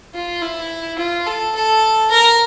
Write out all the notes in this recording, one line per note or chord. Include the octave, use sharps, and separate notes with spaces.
F4
E4
F4
A4
A4
A#4